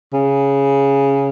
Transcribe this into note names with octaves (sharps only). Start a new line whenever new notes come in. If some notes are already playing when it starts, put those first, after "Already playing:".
C#3